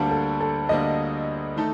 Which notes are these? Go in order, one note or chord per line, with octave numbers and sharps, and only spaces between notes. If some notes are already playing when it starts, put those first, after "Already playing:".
Already playing: D2 D3 G3 A#3 D4 A4
A4
A4
D2 D3 G3 A#3 D4 D#5
D#3 A3 D#4 A4